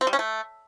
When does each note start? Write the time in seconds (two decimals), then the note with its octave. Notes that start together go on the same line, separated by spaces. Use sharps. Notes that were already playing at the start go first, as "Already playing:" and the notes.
0.01 C4
0.07 G3
0.13 C#4
0.19 A3